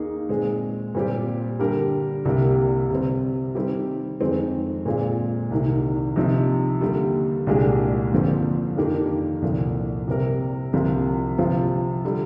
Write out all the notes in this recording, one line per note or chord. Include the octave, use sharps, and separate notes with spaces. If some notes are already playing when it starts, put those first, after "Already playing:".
Already playing: D#2 D#3 A#3 D#4 G#4
A#2 G#3 C4
A#2 G3 C4 G4
D3 G3 D4 G4 A#4
C2 C3 G3 A#3
C3 G3 C4
D#3 G3 C4 G4
F2 D#3 G#3 C4
A#2 G#3 C4 F4
C2 C3 D#3
C3 F3 C4 D#4
D#2 D3 G3
C2 A#2 G#3 D4 G4
D#2 D3 F3 C4
F2 D#3 A#3 D4 G4
C2 A#2 F3
C3 G3 C4 G4 A#4
C2 C3 F3 C4 F4
C3 F3 C4 F4
D3 G3